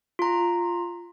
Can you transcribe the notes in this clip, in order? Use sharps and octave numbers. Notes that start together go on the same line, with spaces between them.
F4 A#5